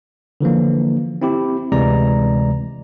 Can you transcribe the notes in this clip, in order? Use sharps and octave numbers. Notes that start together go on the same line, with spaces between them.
D3 E3 F3 A#3
C4 E4 G4
D2 C3 E3 G#3 D5 A#5